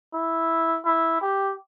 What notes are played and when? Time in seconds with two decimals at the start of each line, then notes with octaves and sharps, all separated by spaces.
0.14 E4
0.85 E4
1.21 G4